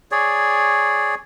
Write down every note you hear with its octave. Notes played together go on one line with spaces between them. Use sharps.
G#4 C#5 D5